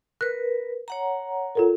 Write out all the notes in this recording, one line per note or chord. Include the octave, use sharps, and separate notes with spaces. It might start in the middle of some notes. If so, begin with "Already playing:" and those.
A#4 B4 F#6
C#5 F#5 A#5
F4 A4 A#4